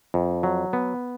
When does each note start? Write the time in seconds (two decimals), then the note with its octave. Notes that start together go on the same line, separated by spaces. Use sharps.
0.14 F2
0.43 F#3
0.73 B3